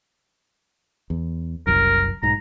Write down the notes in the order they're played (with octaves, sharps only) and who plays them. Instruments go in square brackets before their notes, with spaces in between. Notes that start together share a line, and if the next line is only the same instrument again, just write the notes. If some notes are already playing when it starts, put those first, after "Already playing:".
[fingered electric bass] E2
[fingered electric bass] F#1 C2 F#2 [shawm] A#4
[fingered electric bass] B1 G#2 [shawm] A#5